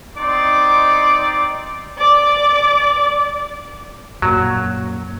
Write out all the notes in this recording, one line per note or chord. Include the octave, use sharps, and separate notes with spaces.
C4 D#4 D5 C6 D6
D5 D6
F#2 A#2 F#3